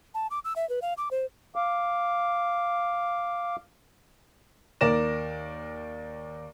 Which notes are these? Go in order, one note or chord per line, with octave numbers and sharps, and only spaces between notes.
A5
D6
E6
E5
B4
F5
D6
C5
F5 D6
D#2 A#4 D5 A#6 E7